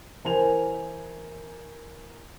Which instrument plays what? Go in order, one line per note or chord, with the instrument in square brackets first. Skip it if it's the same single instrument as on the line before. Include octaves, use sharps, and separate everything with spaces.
[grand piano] E3 A#4 C5 G#5 F7